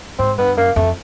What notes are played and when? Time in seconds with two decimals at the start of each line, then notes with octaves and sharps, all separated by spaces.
0.19 G#2 C4
0.38 G2 B3
0.57 F#2 A#3
0.76 F2 A3